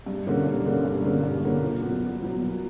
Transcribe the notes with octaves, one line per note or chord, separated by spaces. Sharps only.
G2
D3 A#3 C#4
G2
D3 A#3 C#4
G2
D3 A#3 C#4
G2
D3 A#3 C#4
A#2
F#3 B3
A#2
F#3 B3
A#2